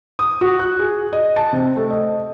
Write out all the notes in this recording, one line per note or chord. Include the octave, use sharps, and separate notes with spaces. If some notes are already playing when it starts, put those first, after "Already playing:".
D#6
F#4
F#6
G#4
D#5
A5
C3
A3
D#5